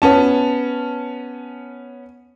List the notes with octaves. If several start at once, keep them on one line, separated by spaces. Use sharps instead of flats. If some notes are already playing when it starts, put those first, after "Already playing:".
B3 C#4 A5